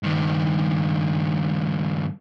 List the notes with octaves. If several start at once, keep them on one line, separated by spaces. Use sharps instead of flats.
G2 D#3